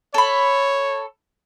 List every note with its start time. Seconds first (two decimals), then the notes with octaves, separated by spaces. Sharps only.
0.14 A4 C#5 B5